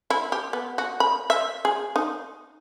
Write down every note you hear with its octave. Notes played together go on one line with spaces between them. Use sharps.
E4
G4
B3
F#4
B5
E5
G#4
D#4